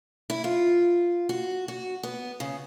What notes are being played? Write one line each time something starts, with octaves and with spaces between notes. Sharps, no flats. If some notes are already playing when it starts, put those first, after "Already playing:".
E4
F4
F#4
F#4
B3
C#3